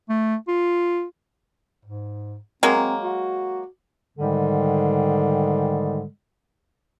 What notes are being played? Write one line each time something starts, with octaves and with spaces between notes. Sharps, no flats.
A3
F4
G#2
F#3 G#3 A#3 C4
C4
F#4
G#2 D3 D#3 G3 G#3